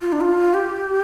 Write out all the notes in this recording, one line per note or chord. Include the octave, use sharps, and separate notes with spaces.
F4
D4
F4
G4